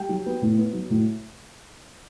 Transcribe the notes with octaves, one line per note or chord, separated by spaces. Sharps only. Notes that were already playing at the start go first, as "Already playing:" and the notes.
Already playing: G3 G5
F#3
B3
A2
B3
F#3
A2